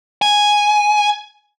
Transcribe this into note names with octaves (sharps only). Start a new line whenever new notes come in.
G#5